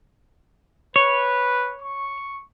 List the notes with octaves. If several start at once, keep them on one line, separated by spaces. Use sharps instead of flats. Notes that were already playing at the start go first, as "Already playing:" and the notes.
B4 C#5
C#6